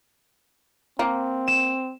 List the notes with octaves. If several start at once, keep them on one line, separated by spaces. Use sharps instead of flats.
A#3 C4
E7